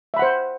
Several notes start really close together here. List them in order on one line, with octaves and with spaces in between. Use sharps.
E5 B5 F#5 C5